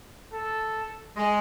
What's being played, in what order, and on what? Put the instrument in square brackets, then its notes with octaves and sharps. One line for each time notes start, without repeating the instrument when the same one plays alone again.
[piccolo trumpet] A4
[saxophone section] G#3